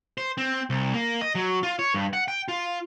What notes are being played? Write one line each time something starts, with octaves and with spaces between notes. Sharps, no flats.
C5
C4
C2
A#3
D#5
F#3
F4
C#5
G2
F#5
G5
F4